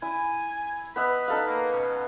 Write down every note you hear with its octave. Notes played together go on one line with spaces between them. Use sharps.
E4 G#5
B3 B4 D#5 E5 B5
D#4 A4 F5
A#3
B2 C#4